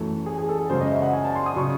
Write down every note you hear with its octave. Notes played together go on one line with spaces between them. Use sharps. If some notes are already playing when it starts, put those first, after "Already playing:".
Already playing: F#2 E3 A3
G#4
G#4
A4
A4
F#2 C#3 G#3 C5
D#5
E5
F#5
G#5
A5
C6
D#6
C#3 F#3 C#6